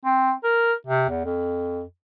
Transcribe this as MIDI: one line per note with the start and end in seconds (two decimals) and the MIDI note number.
0.05 0.32 60
0.44 0.73 70
0.87 1.06 48
1.09 1.24 40
1.25 1.82 41